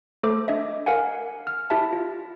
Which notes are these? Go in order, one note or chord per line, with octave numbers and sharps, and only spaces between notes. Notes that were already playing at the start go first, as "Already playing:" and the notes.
A3 A4 C5 D6
D4 D#5 E5
A#4 F5 F#5 G#5
F6
E4 G4 E5 A5
F4